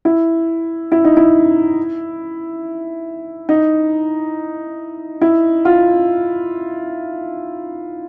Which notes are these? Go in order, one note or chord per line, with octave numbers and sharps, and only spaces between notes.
E4
E4
D#4
E4
D#4
E4
F4